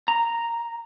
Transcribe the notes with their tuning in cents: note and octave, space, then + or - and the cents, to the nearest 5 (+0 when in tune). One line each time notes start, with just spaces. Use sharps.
A#5 -5